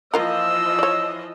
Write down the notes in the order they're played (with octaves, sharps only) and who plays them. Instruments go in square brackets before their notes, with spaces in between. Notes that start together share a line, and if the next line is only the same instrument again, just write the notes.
[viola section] E3 F3 D#5 [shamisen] A#3 F4 A#4 [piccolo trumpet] E6
[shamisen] C#5 D5